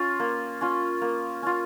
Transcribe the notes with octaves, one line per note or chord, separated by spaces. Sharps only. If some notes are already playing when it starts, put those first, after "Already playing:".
Already playing: C#4 F4
A#3
C#4 F4
A#3
C#4 F4